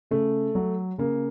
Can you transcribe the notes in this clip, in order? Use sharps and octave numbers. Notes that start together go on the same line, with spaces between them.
C#3 A3
F#3
C#3 A#3